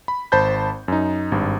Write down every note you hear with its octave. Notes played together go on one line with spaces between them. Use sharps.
B5
G#1 C5 A5 B5 G6
F#2 D#4
G#1 G2